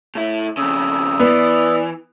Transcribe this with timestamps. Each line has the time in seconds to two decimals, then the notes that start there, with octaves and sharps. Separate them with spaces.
0.15 A2 E4
0.57 F2 C#3 D#6 E6
1.19 E3 B3 D5